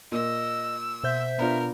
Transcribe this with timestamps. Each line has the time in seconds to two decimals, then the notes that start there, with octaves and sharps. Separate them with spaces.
0.12 A#2 D#5 E6
1.04 B2 C5 E5 G6
1.38 B3 D4 F4 A#4